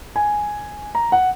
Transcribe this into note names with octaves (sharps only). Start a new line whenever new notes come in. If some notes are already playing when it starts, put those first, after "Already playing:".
G#5
A#5
F#5